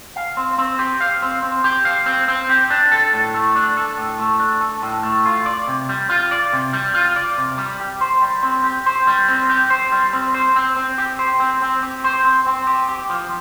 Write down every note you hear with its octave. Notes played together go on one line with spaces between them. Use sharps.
F5
C4
C4
G4
F5
C4
C4
G4
F5
C4
C4
G4
D4
A4
A2
A3
D4
A4
A2
A3
D4
A4
A2
A3
F4
D5
C3
G3
F4
D5
C3
G3
F4
D5
C3
G3
G4
C5
G3
C4
G4
C5
G3
C4
G4
C5
G3
C4
C5
C4
C4
G4
C5
C4
C4
G4
C5
C4
C4
G4
G4
F3